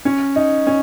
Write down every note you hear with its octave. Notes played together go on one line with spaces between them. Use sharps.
C#4
D#4
C#4